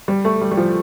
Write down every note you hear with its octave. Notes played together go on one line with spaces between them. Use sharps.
G3
A3
G3
G3
F3